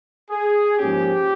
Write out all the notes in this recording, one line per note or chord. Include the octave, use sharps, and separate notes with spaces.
G#4
G#2 F3 A#3 C#4 G4